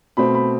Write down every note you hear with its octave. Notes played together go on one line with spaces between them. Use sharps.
B2 A3 C4 B5
B5